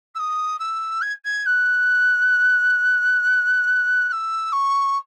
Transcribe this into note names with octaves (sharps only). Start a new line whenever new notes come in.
E6
D#6
E6
G#6
G#6
F#6
F#6
E6
C#6